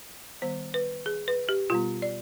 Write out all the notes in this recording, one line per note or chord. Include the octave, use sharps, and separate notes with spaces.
D#3 G3 B3 C5
B4
G#4
B4
G4
B2 G3 B3 F4
D5